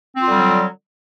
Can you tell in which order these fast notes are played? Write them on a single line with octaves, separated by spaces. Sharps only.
C4 F4 D3 G3 F#3